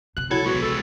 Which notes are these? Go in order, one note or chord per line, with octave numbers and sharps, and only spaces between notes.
C#2 C3 F#6
A#1 F#3 E4 A4 G#6
G#3 B3 F#4
A4